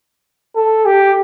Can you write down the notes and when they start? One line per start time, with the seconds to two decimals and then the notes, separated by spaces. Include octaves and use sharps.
0.55 A4
0.86 G4